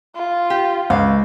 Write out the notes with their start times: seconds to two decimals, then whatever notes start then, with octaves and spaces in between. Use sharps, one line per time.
0.16 F4
0.50 G4
0.90 C#2 F5